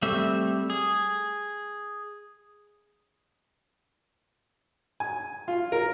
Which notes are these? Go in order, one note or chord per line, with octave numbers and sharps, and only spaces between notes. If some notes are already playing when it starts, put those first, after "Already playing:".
G3 A3 C4 E5
G#4
G#5
F4
A#4